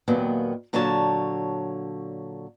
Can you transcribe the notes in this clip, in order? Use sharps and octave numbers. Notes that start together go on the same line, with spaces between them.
D#2 A#2 D#3 F#3 B3
A#2 D3 F#3 C#5 A5